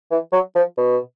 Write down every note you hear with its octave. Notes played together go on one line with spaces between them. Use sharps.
E3
F#3
F3
B2